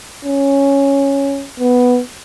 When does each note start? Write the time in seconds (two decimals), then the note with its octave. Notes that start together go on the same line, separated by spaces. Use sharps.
0.25 C#4
1.60 B3